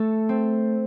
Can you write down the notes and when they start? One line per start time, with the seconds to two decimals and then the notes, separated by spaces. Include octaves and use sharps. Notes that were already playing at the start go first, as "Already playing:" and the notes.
Already playing: A3 A4
0.29 C4